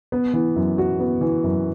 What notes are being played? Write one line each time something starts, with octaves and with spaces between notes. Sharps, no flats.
B3
E3
F#2
F#4
B3
E3
F#2